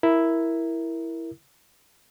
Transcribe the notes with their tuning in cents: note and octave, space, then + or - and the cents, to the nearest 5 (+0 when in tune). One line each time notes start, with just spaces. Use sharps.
E4 +0 A#4 +0